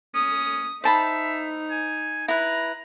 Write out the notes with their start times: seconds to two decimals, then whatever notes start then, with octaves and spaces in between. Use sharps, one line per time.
0.14 C#4 D#6
0.84 D#4 C5 E5 A5 B5
1.71 G#5
2.28 E4 B4 A#5